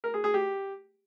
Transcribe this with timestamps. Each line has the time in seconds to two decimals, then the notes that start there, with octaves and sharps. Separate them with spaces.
0.04 A#4
0.14 G#4
0.24 G#4
0.34 G4